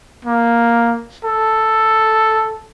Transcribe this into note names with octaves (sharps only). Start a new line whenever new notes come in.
A#3
A4